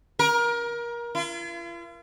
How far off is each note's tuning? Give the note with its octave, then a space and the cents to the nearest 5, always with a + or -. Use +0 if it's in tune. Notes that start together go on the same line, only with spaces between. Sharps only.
A#4 +25
F4 -45